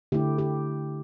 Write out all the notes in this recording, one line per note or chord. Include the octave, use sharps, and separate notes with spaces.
D3 A3 E4 G4
G4